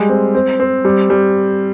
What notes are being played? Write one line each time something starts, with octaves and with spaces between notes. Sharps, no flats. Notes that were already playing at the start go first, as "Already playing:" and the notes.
Already playing: G3 G#3
C4
C4
C4
G3
G3